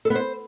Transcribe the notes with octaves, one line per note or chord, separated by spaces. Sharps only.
A4
B3
C5